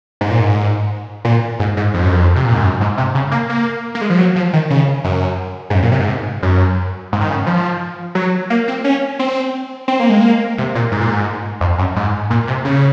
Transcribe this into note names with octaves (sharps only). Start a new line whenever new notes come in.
G#2
A#2
G#2
A#2
G#2
G#2
F2
F#2
F2
C3
A#2
G#2
F#2
G#2
C3
C#3
A#3
A#3
A#3
G#3
F3
F#3
F3
D#3
C#3
F#2
G#2
F#2
A#2
C3
G#2
F#2
G#2
D#3
C#3
F3
F#3
A#3
C4
C#4
C4
C4
A#3
G#3
A#3
C3
A#2
G#2
A#2
G#2
F2
F#2
G#2
A#2
C3
C#3